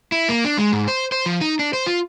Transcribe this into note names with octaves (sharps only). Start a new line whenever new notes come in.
E4
A#3
D4
G#3
G#2
C5
C5
F3
D#4
D4
C5
F4